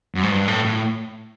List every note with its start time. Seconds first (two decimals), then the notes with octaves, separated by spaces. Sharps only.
0.15 F#2
0.23 G#2
0.31 G2
0.48 A2
0.64 A2